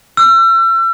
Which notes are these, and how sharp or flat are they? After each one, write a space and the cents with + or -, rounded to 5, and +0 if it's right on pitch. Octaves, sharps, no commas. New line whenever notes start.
E6 +40